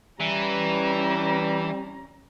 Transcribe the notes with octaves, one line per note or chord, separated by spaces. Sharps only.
E3 G3 C#4 A#5